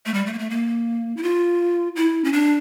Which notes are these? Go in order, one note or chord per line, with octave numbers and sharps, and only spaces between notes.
A3
G3
A3
A#3
A3
A#3
E4
F4
E4
C#4
D4